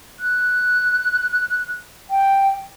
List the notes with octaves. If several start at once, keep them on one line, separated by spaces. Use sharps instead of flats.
F#6
G5